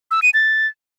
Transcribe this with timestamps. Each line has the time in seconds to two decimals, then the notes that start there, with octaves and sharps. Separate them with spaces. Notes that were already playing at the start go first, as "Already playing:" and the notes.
0.11 E6
0.22 D#7
0.34 A6